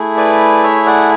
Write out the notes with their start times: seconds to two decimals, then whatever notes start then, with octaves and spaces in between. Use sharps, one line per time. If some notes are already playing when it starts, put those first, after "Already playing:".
Already playing: A3 E4 G#4
0.17 B4 D5
0.63 C#5 E5
0.86 D5 F#5